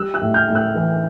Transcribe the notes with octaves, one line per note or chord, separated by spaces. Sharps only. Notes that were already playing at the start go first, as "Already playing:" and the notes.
Already playing: G3 E6 F#6
E6 F#6
A2
F6 G6
A2
E6 F#6
E3